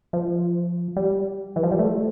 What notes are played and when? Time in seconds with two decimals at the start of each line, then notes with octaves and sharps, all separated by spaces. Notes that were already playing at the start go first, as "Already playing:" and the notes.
0.13 F3
0.96 G3
1.56 E3
1.63 F3
1.72 G3
1.79 A3